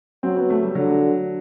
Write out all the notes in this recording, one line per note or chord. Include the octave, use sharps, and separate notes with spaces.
F#3 C4
B3
A3
G3
D3 F#3